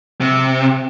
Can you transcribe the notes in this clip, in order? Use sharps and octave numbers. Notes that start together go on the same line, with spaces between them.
C3